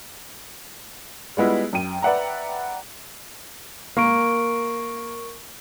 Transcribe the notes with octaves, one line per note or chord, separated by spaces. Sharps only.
G3 G#3 B3 E4 F4
F#2 G5 D#7
B4 D5 E5 F#5 G5 A#5
A#3 A#4 C#6 D7